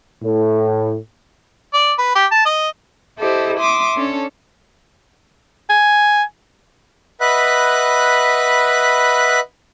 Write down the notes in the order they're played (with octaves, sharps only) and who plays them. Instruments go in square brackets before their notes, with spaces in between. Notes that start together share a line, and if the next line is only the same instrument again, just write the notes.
[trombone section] A2
[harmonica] D5
B4
G4
A5
D#5
[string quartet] E4 G4 A4 C5 D#5
E5 C6 D6 D#6
C#4 D4 A4 C#5
[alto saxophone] G#5
[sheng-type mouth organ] B4 D#5 E5 F#5 B5 F#6